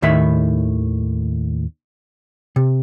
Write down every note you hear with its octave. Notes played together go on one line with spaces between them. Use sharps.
D#2 A2 D#3 E5 B5
C3